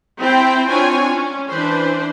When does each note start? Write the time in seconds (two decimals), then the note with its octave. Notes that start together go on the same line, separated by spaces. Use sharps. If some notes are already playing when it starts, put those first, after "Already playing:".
0.20 C4 E4 C5 G5
0.68 C4 D4 E4 F4 C#5 G#5
1.13 C#4
1.50 E3 D4 B4 C5